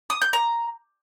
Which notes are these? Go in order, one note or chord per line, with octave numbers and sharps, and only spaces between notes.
D#6
G6
A#5